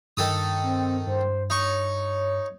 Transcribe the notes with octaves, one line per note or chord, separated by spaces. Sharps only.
G2 D#3 A4 D#6
C4
G2 C5
D#4 C#5 C#6